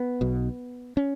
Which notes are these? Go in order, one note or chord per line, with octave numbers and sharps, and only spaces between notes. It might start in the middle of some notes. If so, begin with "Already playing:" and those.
Already playing: B3
B1 B2
C#4